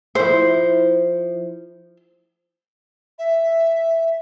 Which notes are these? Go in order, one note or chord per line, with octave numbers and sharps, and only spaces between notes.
F3 E4 C5
E5